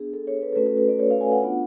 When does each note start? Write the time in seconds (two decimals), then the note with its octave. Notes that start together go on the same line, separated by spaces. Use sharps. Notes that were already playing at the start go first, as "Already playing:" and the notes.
Already playing: B3 D4 G#4
0.13 A4
0.27 C#5
0.42 B4
0.53 A4
0.56 A3 C#4 F#4 B4
0.66 A4
0.77 B4
0.89 D5
0.99 C#5
1.11 F5
1.21 G#5
1.32 F#5
1.43 B3 D4 F4